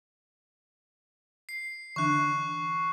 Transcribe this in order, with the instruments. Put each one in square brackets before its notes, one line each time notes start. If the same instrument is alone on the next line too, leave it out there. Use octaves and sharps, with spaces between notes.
[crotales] C7
[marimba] D3 E3 D4 [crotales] C#6 F#6